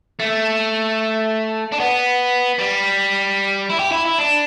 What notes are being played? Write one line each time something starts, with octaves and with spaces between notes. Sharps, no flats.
A3
D4
B3
G3
E4
G4
E4
E4
D4